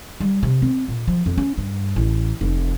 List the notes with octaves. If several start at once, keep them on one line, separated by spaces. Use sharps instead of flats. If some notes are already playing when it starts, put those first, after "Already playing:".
G3
C3
C4
A#2
F3
F2
C#4
G2
A1
F1